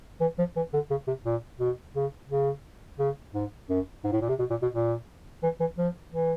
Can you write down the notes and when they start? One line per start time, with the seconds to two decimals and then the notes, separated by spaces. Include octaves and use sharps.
0.21 E3
0.38 F3
0.56 E3
0.73 D3
0.90 C#3
1.07 C3
1.25 A#2
1.60 B2
1.95 C#3
2.29 C#3
2.99 C#3
3.34 G#2
3.69 F#2
4.04 G#2
4.12 A2
4.21 A#2
4.29 C3
4.39 B2
4.50 A#2
4.62 B2
4.73 A#2
5.43 E3
5.60 E3
5.78 F3
6.12 E3